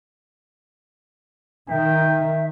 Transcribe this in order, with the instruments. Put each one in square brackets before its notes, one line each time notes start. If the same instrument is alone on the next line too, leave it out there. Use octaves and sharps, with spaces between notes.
[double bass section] D#3 [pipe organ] E5 [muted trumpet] G5